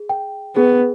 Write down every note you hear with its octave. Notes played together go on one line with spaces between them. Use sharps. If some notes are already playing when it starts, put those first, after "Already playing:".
Already playing: G#4
G5
B3 G#4